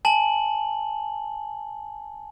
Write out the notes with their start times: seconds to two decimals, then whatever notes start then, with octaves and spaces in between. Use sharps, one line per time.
0.05 G#5 A5 F#7